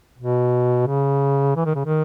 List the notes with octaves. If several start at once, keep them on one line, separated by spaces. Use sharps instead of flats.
B2
C#3
E3
D#3
C#3
D#3